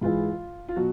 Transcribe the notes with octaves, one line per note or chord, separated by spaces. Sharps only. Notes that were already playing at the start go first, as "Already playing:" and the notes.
G#2 E3 G#3 F4
F4
B2 F#3 F#4